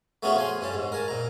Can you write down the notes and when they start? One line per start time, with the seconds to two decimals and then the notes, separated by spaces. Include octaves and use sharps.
0.23 A3 B3 C#4 F4 F#4 G#4
0.36 F3 G#5 C6
0.61 G2 C#4 A5
0.74 G#2
0.92 A#4 G#5 A5
1.08 A#2 A#5